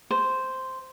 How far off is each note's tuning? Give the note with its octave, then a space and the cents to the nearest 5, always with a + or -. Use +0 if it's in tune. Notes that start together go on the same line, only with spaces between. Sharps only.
C5 -5